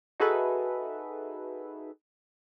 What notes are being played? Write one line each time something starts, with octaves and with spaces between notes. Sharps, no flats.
D#4 F#4 G#4 A4 B4 E5